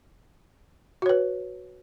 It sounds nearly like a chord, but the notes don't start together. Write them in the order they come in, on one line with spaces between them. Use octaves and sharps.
F#4 C#5 B4